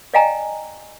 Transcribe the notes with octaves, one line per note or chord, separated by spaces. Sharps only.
D5 D#5 F5 G5 G#5 A#5